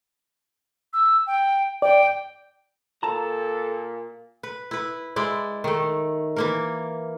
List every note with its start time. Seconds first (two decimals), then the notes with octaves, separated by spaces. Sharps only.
0.93 E6
1.27 G5
1.82 D5 G5
3.03 A#2 A4 A5 A#5
4.43 B4
4.71 E4 B4
5.16 G#3 E4 D5
5.64 D#3 A3
6.36 E3 A#3 A#4